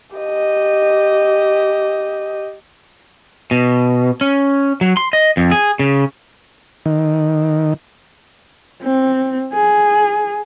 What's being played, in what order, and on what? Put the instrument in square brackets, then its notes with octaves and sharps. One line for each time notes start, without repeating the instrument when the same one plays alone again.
[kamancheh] G4 D#5
[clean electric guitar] B2
C#4
F#3
C6
D#5
F2
G#4
C#3
[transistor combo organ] D#3
[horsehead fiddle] C4
G#4